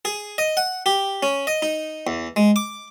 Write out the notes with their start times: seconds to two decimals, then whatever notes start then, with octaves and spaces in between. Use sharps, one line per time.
0.05 G#4
0.38 D#5
0.57 F#5
0.86 G4
1.23 C#4
1.47 D#5
1.62 D#4
2.07 E2
2.36 G#3
2.56 D6